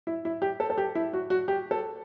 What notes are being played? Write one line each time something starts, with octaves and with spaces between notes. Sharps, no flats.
E4
E4
G4
A4
A4
G4
E4
F#4
F#4
G4
A4